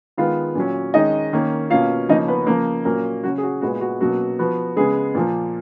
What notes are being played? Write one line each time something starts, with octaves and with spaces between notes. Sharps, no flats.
D#3 G#3 B3 F4 F5
A#2 F#3 C#4
D#3 G#3 C#4 D#4 D#5
D#3 A#3 C#4
B2 A#3 C#4 F4 F5
C#3 F3 A#3 C#4 D#4 D#5
B3 B4
C#3 F3 A#3 A#4
A#2 F#3 A#3 C#4 A#4
C#3 F#3 C#4 F#4
G#4
F#4
A#2 G#3 B3 F#4
F#4
B2 F#3 A#3 C#4 F#4
F3 B3 F#4
C#3 G#3 B3 G#4
A#2 F3 A#3